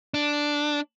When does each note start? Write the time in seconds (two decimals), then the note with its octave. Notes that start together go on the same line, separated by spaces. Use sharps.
0.14 D4